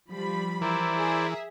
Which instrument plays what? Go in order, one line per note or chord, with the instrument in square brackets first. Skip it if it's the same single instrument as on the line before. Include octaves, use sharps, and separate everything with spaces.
[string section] F3 G3 B5
[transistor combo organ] E3 [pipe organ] E4 C5 D5 [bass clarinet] A#4
[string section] G#4 E5